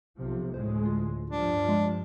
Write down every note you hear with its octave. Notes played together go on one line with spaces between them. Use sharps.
B1 C3 F3
D2 A2 G#3 C5
F4
G2 F3 D4
G#3